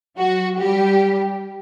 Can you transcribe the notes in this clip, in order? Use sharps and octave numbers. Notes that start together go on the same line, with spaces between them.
F#3 F#4
G3 G4